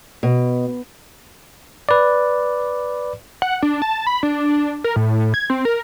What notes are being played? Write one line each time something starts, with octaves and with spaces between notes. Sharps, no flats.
B2
B4 D5
F#5
D4
A5
B5
D4
A#4
A2
G#6
C4
A#4